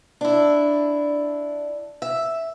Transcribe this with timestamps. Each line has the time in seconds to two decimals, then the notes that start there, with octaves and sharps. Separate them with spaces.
0.21 D4 E4
2.02 E5